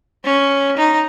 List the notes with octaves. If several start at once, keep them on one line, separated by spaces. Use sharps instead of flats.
C#4
D#4